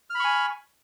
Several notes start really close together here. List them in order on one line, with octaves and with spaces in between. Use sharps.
F6 B5 C#6 G#5